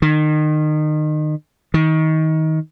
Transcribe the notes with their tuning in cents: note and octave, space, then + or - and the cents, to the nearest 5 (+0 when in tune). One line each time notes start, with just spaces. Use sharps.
D#3 -30
D#3 +25